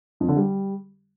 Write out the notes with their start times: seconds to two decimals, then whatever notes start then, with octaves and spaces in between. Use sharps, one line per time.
0.20 F2
0.28 D3
0.36 G3